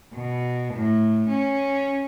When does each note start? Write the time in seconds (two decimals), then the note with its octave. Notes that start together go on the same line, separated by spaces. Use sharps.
0.14 B2
0.74 A2
1.28 C#4